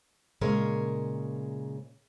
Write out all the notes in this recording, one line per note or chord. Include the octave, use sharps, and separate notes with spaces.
A#2 C#3 G#3 A#4 C#5